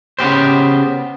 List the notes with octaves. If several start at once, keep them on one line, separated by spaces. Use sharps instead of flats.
C#3 B3 G4 C5